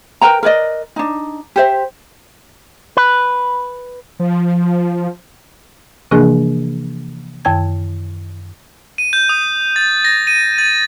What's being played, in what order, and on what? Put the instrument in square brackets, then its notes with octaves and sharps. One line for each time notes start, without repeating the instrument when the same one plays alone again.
[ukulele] A#4 B4 G5 A#5
A#4 B4 D5 D#5
D4 D#4
G4 C5 E5
[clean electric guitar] B4
[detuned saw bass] F3
[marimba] C3 E3 F3 A#3 D4 G#4
F#2 D#3 A5 G#6
[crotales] D#7
G6
D#6
A6
A#6
D#7
A6